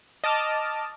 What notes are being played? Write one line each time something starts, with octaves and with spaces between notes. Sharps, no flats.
D#5 A5 D6 F6